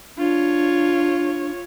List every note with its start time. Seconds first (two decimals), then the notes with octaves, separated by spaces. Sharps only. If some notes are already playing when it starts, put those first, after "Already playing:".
0.18 D4 F4 C#5